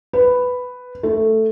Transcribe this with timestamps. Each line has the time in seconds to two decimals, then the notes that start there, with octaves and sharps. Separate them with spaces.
0.13 B4
1.03 A3